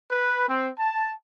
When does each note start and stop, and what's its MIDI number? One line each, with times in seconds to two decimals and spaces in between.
0.11 0.44 71
0.49 0.69 60
0.79 1.13 81